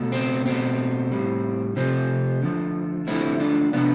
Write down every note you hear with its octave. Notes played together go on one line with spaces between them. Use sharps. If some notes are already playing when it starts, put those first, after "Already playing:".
Already playing: B2 A3
C4
B2 A3 C4
A2 G3
C3 F3 A3 C4
D3 F3 A3
D3 F3 A3 C4 E4
D4 F4
C3 F3 A3 B3 D4